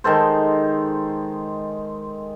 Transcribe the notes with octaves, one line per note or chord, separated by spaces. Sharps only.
D#3 G#3 A4 C5